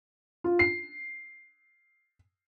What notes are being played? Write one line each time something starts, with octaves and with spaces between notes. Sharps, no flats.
F4
C7